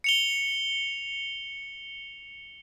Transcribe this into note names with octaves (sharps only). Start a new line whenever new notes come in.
C#7 F7 G7